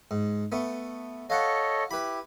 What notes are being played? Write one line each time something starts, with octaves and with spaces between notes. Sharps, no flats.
G#2
A3 B3
A4 C#5 D#5 F5 F#5
E4 G4 B4 B5